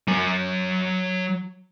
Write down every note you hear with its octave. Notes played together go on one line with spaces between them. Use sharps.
F#3 G#5